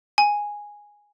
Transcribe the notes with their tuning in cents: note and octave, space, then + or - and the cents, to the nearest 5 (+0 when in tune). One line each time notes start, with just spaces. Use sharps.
G#5 -5